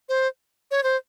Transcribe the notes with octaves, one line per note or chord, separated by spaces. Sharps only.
C5
C#5
C5